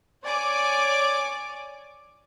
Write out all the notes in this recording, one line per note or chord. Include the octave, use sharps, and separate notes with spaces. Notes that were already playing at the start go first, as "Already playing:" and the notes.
C#5 D5 G#5 D6